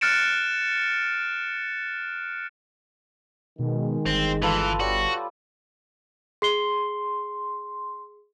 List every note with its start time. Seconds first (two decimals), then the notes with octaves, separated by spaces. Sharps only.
0.01 F6 F#6 A6 C#7 D7 E7
3.59 B2 D#3 G#3
4.06 G1 C4
4.42 E3 F4 A4 B4
4.80 G3 F#4 C#5
6.42 G#4 C6 C7 G7